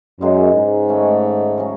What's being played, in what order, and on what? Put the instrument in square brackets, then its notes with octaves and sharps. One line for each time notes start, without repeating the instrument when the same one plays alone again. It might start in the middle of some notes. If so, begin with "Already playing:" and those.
[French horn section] F#2 [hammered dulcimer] C#3 G#3 D#4 G#4
[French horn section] G#2
[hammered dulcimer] D#3 A3 C#4
C#3 F#3 C#4